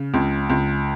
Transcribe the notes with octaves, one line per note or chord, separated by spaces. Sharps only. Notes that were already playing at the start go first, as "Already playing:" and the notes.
Already playing: C#3
C#2
C#2